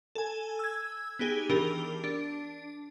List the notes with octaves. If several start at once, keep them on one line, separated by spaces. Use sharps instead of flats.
A4 G#5
E6 G#6
B3 D#4 G4 G#4
E3 D4 G4 A#4
D4